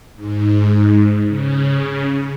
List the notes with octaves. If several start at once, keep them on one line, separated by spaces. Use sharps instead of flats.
G#2
C#3